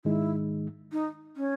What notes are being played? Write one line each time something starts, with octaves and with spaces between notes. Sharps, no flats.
G#2 D#3 G#3 D#4 E4
D#4
C#4